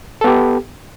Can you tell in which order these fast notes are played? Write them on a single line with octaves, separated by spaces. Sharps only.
A4 B3 G4